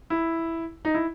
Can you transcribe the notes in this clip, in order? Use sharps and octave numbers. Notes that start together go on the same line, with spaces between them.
E4
D#4
E4